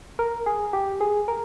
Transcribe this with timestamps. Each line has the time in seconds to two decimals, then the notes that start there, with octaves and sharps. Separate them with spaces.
0.19 A#4
0.46 G#4
0.73 G4
1.01 G#4
1.28 A#4